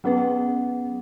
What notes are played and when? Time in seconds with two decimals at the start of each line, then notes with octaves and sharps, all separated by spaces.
0.04 F#3 B3 C#4 G#4 B4